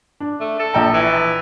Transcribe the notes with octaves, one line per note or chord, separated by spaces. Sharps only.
D4
A3
A4
A#1 G5 A#5
E3